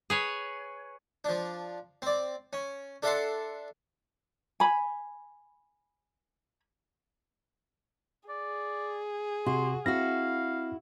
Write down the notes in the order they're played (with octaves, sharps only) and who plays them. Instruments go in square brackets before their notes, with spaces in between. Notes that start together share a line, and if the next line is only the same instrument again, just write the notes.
[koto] G#4 B4 C#5
[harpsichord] F3 D4
C4 D5
C#4
D4 A4 E5 F#5 A5 C6
[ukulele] G#5 B5
[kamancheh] G#4 [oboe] D5
[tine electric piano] C3 [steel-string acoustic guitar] F#4 [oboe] C6
[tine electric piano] C4 A#6 [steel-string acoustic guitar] E4 F#4 [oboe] F5